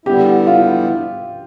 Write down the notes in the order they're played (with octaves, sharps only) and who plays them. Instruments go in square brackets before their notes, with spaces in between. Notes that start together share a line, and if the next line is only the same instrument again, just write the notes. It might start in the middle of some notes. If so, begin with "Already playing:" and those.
[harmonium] D3 G3 B3 E4 [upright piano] G4
[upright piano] F4